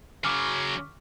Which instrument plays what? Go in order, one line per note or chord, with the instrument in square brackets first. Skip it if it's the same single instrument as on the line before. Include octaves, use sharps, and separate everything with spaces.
[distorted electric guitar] C#3 F#3 [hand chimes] C#6 D6 F6